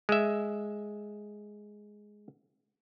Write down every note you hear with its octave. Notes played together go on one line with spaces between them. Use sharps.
G#3 E5